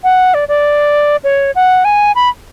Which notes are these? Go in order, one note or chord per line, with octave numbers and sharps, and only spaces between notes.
F#5
D5
D5
C#5
F#5
G#5
B5